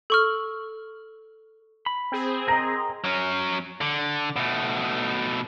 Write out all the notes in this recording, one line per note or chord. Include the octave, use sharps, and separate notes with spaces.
A4 C#6 F6
B5
C4 G#4
A#4 D#5 A#5
F#3 C#4
D3
B2 A3